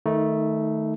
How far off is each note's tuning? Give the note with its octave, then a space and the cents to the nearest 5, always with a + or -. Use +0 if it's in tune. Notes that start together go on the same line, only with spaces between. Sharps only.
D#3 +0 A3 +0 D#4 +25